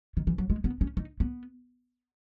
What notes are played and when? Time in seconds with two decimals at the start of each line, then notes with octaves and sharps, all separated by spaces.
0.17 D#3
0.27 E3
0.38 F#3
0.50 G#3
0.64 B3
0.81 C#4
0.97 D#4
1.20 B3